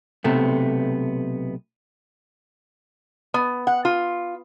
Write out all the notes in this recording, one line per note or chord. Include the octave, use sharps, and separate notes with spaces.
B1 C3 A3 B3
B3
F#5
F4